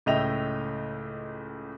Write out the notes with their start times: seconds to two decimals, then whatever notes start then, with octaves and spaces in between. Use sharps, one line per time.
0.06 C#2 A2 D#5 E5 G5 F7